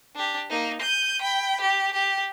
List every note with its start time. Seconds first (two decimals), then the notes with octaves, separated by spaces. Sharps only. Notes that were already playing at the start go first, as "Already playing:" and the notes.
0.16 D4 G4
0.50 A#3 D#4
0.82 G6 D#7
1.22 G5 B5
1.61 G4
1.94 G4